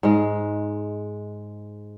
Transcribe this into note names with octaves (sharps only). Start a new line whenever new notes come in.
G#2 G#3